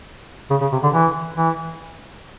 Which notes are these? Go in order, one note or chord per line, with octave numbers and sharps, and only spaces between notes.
C#3
C#3
C3
D3
E3
E3